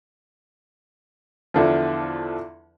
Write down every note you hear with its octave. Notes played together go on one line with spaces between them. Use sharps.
E2 D3 F3